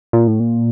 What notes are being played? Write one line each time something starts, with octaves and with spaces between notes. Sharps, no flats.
A#2
A2
A#2